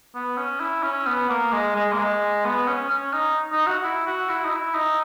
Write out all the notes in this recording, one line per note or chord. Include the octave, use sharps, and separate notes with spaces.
B3
C#4
E4
C#4
B3
A#3
G#3
G#3
A#3
G#3
B3
C#4
C#4
D#4
D#4
F#4
E4
F#4
E4
D#4
E4
D#4